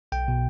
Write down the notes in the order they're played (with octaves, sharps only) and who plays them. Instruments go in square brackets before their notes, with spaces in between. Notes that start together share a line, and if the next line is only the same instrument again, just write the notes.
[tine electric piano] B1 G5
B2